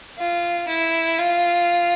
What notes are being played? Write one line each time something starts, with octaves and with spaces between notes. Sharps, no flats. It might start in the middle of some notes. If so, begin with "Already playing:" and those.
F4
E4
F4